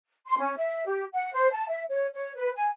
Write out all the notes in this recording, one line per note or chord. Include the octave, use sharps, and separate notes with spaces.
C6
C#4
E5
G4
F#5
C5
A5
E5
C#5
C#5
B4
G#5